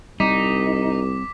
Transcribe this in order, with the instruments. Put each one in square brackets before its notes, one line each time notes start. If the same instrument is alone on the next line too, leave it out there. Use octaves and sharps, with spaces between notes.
[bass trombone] C2 [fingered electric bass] G3 C4 [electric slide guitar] D#4 [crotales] D6 B6